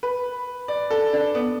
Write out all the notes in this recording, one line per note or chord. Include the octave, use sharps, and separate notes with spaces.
B4
D5
A4
D4
B3